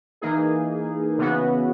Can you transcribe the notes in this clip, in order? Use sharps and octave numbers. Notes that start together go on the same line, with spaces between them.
E3 A#3 D#4 G#4
C#3 E3 B3 F#4